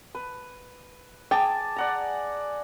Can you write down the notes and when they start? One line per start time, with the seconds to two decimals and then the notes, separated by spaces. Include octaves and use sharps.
0.15 B4
1.31 G#4 G5 A5 D6
1.76 D5 F#5 A#5